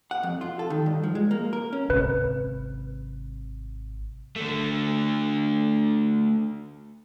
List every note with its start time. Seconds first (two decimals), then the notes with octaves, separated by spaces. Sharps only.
0.11 F#5
0.23 F2
0.41 F4
0.59 A4
0.70 D#3
0.86 G2
1.03 F3
1.15 G#3
1.31 A#3
1.53 A#4
1.73 C#4
1.90 G#1 C3 B4
4.36 D3 A3